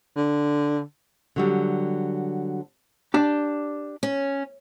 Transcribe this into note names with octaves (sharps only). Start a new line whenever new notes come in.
D3
D3 F#3 G3
D4 G4
C#4